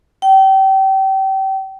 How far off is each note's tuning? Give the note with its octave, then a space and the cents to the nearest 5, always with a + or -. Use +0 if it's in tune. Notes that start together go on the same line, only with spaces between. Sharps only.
G5 -30